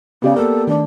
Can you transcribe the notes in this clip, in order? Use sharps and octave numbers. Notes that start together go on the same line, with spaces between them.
C#3 B3 G4 D5
A#3 A4 A#4
D#3 A3 D4